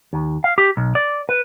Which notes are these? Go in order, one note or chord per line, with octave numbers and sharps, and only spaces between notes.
D#2
F5
G4
B1
D5
B4